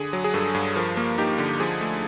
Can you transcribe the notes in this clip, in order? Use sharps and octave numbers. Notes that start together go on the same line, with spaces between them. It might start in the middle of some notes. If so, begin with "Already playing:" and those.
Already playing: D3 G#4
F#3
G#4
G2 A4
G2
F3 A#4
A#3
D#4 G4
D3
F3 G#4
A3 A4